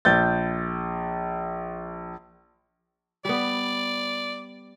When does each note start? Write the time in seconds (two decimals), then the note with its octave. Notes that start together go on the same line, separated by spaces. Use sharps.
0.05 A#1 G6 A6
3.25 G3 B3 D5